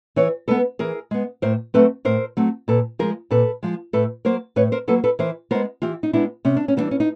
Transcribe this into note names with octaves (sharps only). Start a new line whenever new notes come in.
E3 B4 C#5
G#3 B3 A4 B4
E3 G#4 A#4
G#3 B3
A2 A#4 C5
F#3 A3 C4 A4 B4
A2 A#4 C5
F#3 A3 C4
A#2 A4 B4
F3 G#3 G#4 A#4
A#2 A4 B4
F3 G#3
A2 A4 B4
F#3 A#3 A#4 C5
A2 B4 C#5
A#4 C5
F#3 A#3 A4 B4
A4 B4
E3 A#4 C5
G#3 B3 A#4 C5
E3 F4 G4
D#4
G#3 B3 D4 E4
C3 C#4
D4
C#4
E3 G3 B3 D4
C#4
D#4